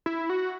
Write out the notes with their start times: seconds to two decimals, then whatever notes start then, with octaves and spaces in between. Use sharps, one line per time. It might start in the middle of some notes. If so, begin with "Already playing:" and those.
0.06 E4
0.30 F#4